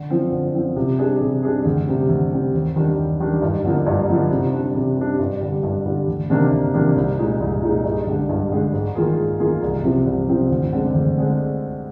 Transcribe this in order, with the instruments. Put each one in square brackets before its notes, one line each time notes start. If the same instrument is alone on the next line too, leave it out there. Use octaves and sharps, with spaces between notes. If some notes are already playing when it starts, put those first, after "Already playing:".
Already playing: [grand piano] D3
F3 C4
D3
F3 C4
C3
G3 D4 G#4
C3
G3 D4 G#4
D2
C3 G3 C4
D2
C3 G3 C4
D#2
D#3 G3 D4
D#2
D#3 G3 D4
G2
D3 F3 A#3 D#4
G2
D3 F3 A#3 D#4
C3
G3 D4
C3
G3 D4
G2
D3 G3
G2
D3 G3
D2
C3 D#3 A#3 D4
D2
C3 D#3 A#3 D4
C2
A#2 G#3 D#4 G#4
C2
A#2 G#3 D#4 G#4
G2
D3 G#3 D4 G4
G2
D3 G#3 D4 G4
G#2
D#3 A#3 F4 G#4
G#2
D#3 A#3 F4 G#4
C2
C3 F3 C4
C2
C3 F3 C4
D2
D3 G#3 C4
D2
D3 G#3 C4